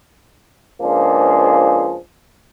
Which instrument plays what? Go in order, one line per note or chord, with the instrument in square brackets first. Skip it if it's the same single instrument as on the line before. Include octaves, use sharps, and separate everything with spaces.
[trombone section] C#2 F3 A#3 D4 G#4 C5